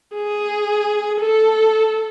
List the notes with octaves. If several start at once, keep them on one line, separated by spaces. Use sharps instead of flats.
G#4
A4